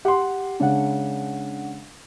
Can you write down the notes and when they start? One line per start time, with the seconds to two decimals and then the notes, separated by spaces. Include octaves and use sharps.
0.05 G4 F#5 C6
0.60 C#3 G#3 D4 F#5